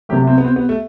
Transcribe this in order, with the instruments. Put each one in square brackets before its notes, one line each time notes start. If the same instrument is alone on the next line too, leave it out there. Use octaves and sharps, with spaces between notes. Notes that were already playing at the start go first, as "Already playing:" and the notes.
[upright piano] C3 F#3 A3 [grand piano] G4
[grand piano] C4
B3
C4
B3
A3